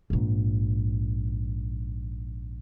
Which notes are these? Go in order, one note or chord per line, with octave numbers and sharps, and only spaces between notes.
A#1 G#2